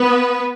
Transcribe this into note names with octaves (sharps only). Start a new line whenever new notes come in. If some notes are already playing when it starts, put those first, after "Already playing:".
Already playing: B3 B4